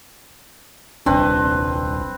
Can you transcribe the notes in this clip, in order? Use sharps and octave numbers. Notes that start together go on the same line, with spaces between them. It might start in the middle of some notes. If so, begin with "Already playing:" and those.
D#1 C2 C4 D4 B4